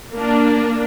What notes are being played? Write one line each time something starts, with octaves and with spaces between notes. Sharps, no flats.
A#3 D4